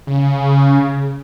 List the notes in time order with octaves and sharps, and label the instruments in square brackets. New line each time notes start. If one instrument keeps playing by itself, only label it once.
[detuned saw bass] C#3